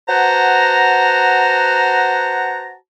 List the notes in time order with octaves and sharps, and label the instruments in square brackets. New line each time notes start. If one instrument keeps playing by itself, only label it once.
[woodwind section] F#4 B4 C5 F#5 A5 A#5